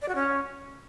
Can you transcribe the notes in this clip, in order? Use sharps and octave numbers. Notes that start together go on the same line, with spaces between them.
D5
F#4
C#4